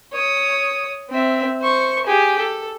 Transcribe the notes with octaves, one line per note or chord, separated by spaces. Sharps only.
C#5 D#6
C4 E5
C5 C#6
G4 G#4
A4